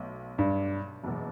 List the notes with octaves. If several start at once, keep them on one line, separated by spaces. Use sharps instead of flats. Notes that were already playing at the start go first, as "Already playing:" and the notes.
Already playing: B1 B2 A3
G2
F#1 E2 B2